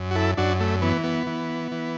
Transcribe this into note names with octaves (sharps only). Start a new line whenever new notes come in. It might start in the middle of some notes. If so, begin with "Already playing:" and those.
Already playing: F#2
F#4
E4 A4
F#2 D4 F#4
A3
E3 B3
B3
E3
E3